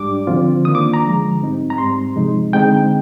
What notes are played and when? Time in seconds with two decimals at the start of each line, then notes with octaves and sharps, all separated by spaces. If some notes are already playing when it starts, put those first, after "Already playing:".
Already playing: G#2 G3 D4 D6
0.27 D3 F3 C4 F4
0.65 D#3 A#3 D4 F4 D#6
0.75 D6
0.94 A#5
1.03 D3 F3 G#3
1.40 G#2 G3 C4 D#4
1.70 A#5
1.78 G#2 G3 C4 C6
2.16 C3 F3 G#3 D#4
2.53 D3 G#3 C4 D#4 G5